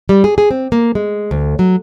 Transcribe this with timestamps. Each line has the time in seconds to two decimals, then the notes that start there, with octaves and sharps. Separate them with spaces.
0.09 G3
0.24 G#4
0.38 G#4
0.51 C4
0.72 A#3
0.95 G#3
1.31 D2
1.59 F#3